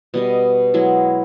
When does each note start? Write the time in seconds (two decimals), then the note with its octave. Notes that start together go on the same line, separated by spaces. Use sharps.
0.14 B2 G3 D#5
0.74 F#3 G#3 E4